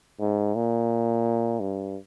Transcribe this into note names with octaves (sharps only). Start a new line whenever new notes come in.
G#2
A#2
G2